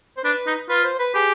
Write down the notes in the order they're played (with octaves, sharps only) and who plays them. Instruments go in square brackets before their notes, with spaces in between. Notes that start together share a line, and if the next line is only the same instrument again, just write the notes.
[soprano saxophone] C5
[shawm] D4 [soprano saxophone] B4
[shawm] D#4
[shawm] F4 [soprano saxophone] B4
[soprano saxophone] C5
B4
[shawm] G4 [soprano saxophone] G#4